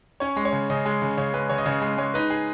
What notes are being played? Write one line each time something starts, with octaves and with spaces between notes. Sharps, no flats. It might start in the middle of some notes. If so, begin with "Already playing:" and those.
C#4 C#5
G#3
C#5
C#3
C#3 D#5
G#3
C#3
C#3 C#5
G#3 B4
C#3 C#5
D#5
C#3 C#5
G#3
G#3 C#5
D#4 B4
G#4